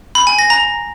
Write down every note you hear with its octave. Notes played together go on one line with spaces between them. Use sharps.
B5
G#5
A#6
A#5